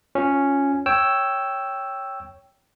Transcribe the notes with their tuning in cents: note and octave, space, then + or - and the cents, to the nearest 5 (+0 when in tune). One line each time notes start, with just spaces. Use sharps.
C#4 +0 F4 +10
C#5 +0 G5 +0 E6 +5